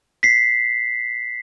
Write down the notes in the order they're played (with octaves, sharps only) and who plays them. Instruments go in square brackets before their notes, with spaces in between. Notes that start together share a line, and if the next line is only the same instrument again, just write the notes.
[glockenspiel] B6 C7